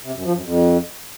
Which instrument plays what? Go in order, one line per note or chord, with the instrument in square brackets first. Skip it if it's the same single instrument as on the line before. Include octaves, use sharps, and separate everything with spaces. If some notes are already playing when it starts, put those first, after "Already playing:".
[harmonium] C3
F#2
F3
F#2
F2